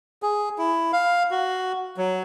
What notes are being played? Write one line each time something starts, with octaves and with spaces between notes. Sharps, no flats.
G#4
E4
F5
F#4
F#3